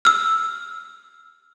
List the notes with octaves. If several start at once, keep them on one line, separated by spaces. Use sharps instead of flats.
E6 F6